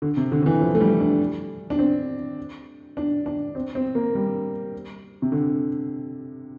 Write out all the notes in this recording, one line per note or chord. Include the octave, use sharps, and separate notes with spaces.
D3
C3
D3
D3
E3
F3
A3
G3
D4
D4
C4
D4
D4
C4
C4
A#3
G3
C3
D3